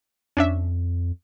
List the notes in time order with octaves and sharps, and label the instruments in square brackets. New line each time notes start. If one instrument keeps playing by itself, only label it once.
[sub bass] F2 [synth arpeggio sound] C#4 D4 E5